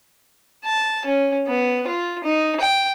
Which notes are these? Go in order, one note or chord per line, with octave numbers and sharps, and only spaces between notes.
A5
C#4
B3
F4
D#4
G5